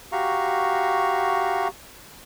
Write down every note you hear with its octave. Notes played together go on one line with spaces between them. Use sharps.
F#4 G4 F5 A#5 C#6